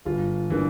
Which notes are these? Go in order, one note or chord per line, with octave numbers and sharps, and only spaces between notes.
G1 F4
E3 A#3 D4